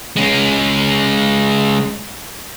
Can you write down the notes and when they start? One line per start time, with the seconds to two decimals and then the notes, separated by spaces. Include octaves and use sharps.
0.16 G#3 C#4